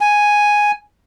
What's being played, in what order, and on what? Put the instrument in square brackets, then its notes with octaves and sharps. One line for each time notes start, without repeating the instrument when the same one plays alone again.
[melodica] G#5